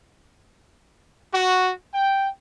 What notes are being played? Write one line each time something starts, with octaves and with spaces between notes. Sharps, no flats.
F#4
G5